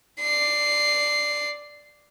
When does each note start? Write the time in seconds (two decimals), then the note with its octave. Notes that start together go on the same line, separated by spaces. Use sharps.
0.20 D5 C7